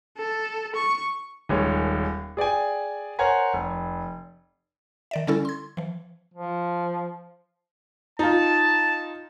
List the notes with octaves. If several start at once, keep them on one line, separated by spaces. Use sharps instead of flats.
A4
C#6
D#1 D#3 G#3 C#5
G#4 D5 G5 G#5
A#4 C5 C#5 F#5 G#5 A#5
F1
D#3 D5 E5
D3 G3 C#4 E4 A4
C6 G#6
E3 F3
F3
D#4 F4 A5